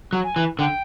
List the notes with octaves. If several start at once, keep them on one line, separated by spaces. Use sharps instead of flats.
F#3
G#5
E3
D3 G5